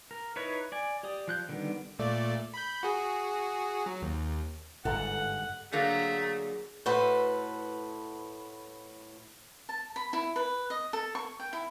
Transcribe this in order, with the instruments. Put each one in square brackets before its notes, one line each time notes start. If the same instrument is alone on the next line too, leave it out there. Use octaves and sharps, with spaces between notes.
[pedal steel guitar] A#4
D#4 E4 B4 C#5
D5 G#5
G4 D5 D#6
F3 F#6 G6
D3 D#3 G3 B3
[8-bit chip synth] A#2 A3 D5
B5 G6
F#4 G#4
F#3
D#2
[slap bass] G1 G#2 [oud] A4 A#4 [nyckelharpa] F#5
[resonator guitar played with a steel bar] D3 F#3 A#3 [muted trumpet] A3 [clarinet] G#4
[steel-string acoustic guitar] A2 F#4 A4 B4 C5
[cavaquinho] A5
B5
E4
B4
D#5
A4
C#6
G5
E4